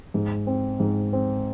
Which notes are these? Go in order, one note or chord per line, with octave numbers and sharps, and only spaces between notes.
G#2
C4
G#2
C4